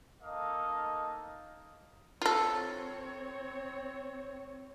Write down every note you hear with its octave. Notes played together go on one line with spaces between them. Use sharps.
A#3 D#4 A4 D#5 F5
C4 F4 A4 C#5